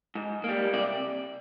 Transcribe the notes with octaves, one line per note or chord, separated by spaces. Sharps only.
G#2
G3 A#3
C3 D5